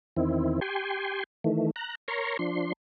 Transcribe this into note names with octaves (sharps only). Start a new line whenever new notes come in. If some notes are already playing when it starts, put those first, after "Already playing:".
E2 D#3 C4 E4
G4 G5 G#5 C6
D#3 E3 A3
A#5 F#6
A#4 C#5 A#5 C6 C#6
F3 D4 C6